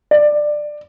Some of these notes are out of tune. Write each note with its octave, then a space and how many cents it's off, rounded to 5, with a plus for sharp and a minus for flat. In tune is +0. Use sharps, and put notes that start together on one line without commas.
D5 +15